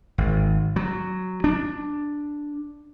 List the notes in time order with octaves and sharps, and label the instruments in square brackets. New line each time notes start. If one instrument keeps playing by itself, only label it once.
[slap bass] G#1
F#3
D4